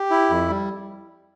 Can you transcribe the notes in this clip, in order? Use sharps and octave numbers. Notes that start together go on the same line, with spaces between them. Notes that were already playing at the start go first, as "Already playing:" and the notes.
Already playing: G4
E4
F2
G3